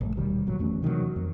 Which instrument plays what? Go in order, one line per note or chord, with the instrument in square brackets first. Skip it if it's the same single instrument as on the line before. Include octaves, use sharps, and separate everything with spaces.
[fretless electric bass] A#1 G2 A3
D#1 B2 D#3 G3
G1 A#2 F#3
E2 A3 C#4
C3 D#3 E3 F#3
F2